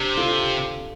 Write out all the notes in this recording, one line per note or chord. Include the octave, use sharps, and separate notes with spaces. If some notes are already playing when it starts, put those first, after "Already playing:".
Already playing: C3 D4 G4
F4 A4